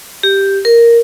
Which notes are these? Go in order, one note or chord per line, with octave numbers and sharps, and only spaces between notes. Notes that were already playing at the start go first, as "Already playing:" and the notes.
G4
A#4